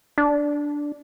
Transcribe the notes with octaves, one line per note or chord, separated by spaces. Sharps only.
D4